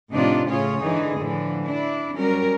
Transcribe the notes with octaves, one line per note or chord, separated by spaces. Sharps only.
A2 C3 F3 D4 D#4 F4
A2 C#3 F4 G#4 C#5
G#2 D3 E3 D#4 G#4
A2 D3 E3 F3
D4 E4
F#3 G3 C#4 A#4